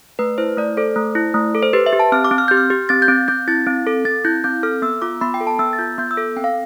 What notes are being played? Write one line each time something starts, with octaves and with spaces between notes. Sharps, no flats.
A3 B4
E4 C5
A3 D5
A4 C5
A3
E4
A3
A4
C5
G4 B4
E5
G4
A5
C4 F6
D6
C4
F6
G4 G6
F6
G4
C4 A6
G6
C4
C4 G6
E4 A6
C4
A4
C4 A6
E4 G6
C4 G6
A4 F6
B3 E6
F4 D6
B3 B5
G5
A4
A5
B3 E6
A6
F4 G6
B3 G6
E6
A4
C4 G5
F5